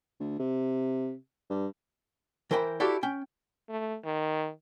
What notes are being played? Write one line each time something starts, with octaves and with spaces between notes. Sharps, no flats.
D2
C3
G2
E3 A#4 C5 G5 A5 B5
E4 F#4 G4 A4 D5 F5
C#4 G5
A3
D#3